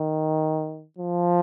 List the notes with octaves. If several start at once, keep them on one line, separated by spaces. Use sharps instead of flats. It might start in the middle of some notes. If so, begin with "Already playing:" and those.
Already playing: D#3
F3